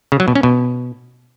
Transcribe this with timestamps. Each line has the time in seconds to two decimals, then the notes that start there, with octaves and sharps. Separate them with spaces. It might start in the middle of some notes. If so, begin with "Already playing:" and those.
0.12 C#3
0.20 F#3
0.28 B2
0.35 C#4
0.43 B2